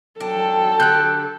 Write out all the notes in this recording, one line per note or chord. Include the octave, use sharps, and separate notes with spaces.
F#3 D4 A4 G5
D3 G4 F#6 G6